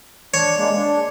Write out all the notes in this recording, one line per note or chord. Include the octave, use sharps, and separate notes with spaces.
D4 C#5
G#3 A#3 D4
D4